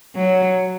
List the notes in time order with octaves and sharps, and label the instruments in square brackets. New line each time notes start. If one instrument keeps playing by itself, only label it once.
[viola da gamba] F#3